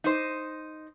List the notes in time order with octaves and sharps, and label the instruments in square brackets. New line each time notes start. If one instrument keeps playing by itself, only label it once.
[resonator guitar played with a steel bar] D#4 C5